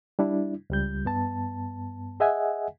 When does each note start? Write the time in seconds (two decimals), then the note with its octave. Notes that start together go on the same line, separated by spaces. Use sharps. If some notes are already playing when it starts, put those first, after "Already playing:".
0.19 G3 D4 E4
0.70 C#2 G3 G6
1.05 G2 B3 A5
2.20 G#4 D#5 E5 F#5 G#5